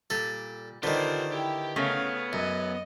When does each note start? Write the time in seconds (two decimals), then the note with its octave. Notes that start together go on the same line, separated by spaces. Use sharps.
0.10 A#2 G3 A4
0.83 D3 D#3 F4 G4 B4 C5 D5
1.32 E4 G4 G5
1.76 C#3 A3 B3 C#4 C#5 F5
2.33 F#2 D#5